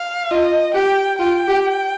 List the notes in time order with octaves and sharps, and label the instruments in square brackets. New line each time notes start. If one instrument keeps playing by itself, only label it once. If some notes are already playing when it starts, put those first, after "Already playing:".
Already playing: [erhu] F5
[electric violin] F4 [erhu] D#5
[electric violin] G4 [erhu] G5
[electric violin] F4 [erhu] G5
[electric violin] G4